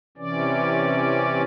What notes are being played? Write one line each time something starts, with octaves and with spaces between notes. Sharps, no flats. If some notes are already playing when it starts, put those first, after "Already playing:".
C3 E3 C#4 D5